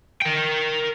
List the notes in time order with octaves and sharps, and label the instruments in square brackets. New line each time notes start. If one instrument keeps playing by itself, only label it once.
[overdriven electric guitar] A#4 G5